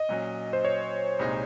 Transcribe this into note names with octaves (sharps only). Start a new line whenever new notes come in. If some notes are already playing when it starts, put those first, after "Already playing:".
Already playing: D#5
A#2 F#3 C#4
C5
C#5
C2 A#2 G#3 D#4